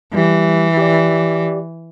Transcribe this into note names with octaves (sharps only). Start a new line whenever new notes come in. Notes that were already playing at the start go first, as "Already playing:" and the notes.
E3 G3 G4
G4 D5